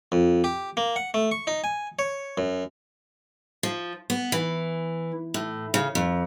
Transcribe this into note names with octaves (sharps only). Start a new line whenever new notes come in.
F2
G4
A#3
F#5
A3
C#6
D#4
G#5
C#5
F#2
F3
B3
E3
A2
C#3
F2